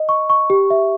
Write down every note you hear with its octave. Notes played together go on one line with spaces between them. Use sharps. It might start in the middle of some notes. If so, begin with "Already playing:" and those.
Already playing: D#5
C#6
C#6
G4
E5